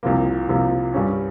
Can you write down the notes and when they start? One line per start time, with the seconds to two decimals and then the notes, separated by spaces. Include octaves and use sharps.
0.03 C2 C3 F3 A#3
0.48 C2 C3 F3 A#3
0.94 G2 G3 C#4